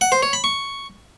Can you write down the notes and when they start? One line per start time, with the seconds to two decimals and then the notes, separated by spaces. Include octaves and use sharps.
0.01 F#5
0.12 C5
0.23 C#5
0.33 B5
0.44 C#6